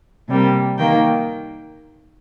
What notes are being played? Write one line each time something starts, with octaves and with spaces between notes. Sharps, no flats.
C3 G3 A#3
D#3 A#3 G5